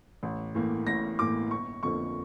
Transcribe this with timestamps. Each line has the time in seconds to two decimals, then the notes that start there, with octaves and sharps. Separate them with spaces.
0.23 A1
0.55 A2 E3 A#3
0.87 A1 A#6
1.19 A2 E3 A#3 D6
1.51 G1 C#6
1.83 F2 D3 F3 A#3 C#6